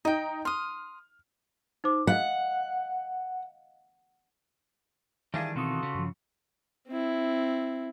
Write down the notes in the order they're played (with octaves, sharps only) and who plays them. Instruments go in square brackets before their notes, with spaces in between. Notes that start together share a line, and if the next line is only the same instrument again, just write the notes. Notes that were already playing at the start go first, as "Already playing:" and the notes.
[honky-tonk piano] D#4 [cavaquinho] D#5 G5
[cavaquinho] C6 D#6 [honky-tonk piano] F6
[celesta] D#4 C5 D6
[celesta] D#5 F5 [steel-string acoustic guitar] F#5
[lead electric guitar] D#3 E3 [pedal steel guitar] G3 D4 G#4 [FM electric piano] E5 F5 G5
[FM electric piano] B2 C4 D#6 [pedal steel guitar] F4 F#4 A4
[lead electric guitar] C#3
[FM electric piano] G2 F3
[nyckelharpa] C4 E4